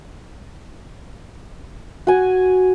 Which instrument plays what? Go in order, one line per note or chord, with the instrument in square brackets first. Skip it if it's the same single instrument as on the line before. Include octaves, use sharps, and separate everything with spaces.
[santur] F#4 G#5